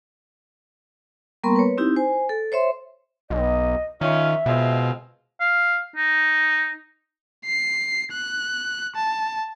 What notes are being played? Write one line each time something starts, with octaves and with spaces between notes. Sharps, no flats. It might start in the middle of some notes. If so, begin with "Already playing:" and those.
G3 A#3 B3 A#4 C6 C#6
B4 C#5
C4 D#4 E4 G4
C5 G#5
A4
C5 C#5 E5 C6
B1 D#5
D#3 C#4 F4 E5
B2 G#3 C4 F4
F5
D#4
C7
F#6
A5